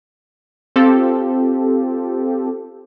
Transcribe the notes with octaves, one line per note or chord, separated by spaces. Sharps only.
C4 F4 G4 A4